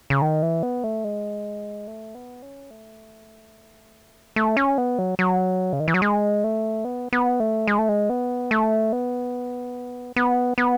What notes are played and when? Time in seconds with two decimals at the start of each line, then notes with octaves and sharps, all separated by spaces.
0.10 C#3
0.22 D#3
0.42 E3
0.63 B3
0.84 A3
1.04 G#3
1.87 A3
2.15 B3
2.42 C#4
2.71 A3
4.36 A3
4.57 C#4
4.78 B3
4.99 F#3
5.19 F#3
5.73 C#3
5.80 D#3
5.88 E3
5.94 F#3
6.02 G#3
6.44 A3
6.85 B3
7.13 B3
7.40 A3
7.67 G#3
7.78 A3
7.89 G#3
8.10 B3
8.51 A3
8.92 B3
10.16 B3
10.58 B3